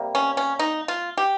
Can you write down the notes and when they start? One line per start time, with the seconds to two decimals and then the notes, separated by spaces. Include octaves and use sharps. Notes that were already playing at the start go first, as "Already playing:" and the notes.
Already playing: C3 G3 A#3
0.15 C#4
0.37 C#4
0.59 D#4
0.88 F4
1.18 G4